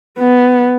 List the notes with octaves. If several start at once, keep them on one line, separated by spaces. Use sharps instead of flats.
B3